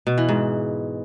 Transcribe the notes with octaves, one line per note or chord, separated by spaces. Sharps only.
B2
E3
G#2